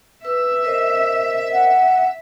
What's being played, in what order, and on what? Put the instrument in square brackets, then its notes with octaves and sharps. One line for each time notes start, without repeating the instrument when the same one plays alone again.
[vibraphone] B4 [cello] E5 [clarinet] E6
[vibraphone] A#4 C5 D#5
[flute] F#5